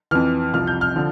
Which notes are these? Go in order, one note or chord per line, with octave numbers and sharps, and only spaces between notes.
F2 E3 F6
C2 C3 F3 F6
G6
F6
D3 F3